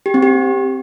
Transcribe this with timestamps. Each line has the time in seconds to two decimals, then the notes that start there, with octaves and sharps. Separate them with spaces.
0.06 G4
0.14 C4
0.23 G4